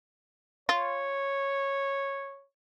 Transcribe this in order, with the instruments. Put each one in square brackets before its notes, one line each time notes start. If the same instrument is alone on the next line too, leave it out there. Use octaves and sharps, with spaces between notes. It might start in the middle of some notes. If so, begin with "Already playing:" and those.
[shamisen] F4 [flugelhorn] C#5